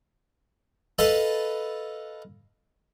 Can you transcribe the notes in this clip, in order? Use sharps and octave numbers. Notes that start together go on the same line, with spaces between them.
A4 B4 D#5 F5 A5